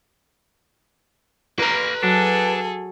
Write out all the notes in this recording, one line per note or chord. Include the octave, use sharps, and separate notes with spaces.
A#3 B4 A#5
F#3 D4 G#4 A4